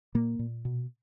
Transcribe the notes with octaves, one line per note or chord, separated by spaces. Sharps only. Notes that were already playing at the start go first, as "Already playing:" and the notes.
A#2 A#3
A#2
B2